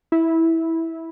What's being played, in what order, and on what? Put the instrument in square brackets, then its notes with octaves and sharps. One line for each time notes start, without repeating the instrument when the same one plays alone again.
[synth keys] E4